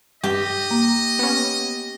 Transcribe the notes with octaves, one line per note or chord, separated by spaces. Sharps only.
G2 G4 D#5
A#3
B3 C#4